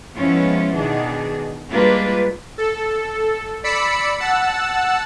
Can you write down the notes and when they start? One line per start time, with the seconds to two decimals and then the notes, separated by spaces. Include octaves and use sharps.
0.19 F3 G#3 B3 C#4 E4 F4
0.77 B2 D#3 D4 G#4
1.70 G3 G#3 A#3 D4 F4 B4
2.58 A4
3.64 D5 B5 E6 B6 C#7
4.20 F#5 A5 E6